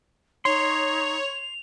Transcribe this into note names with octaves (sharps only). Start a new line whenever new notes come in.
D#4 C#5 C6 F7